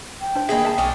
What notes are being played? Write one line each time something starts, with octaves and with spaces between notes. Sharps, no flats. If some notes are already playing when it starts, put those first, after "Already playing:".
G5
D4 C5
D#3 G#3 A#3 G#4 B4 D#5 E5
E5 A5
B1 G#3 D4 D#4 C#6 F6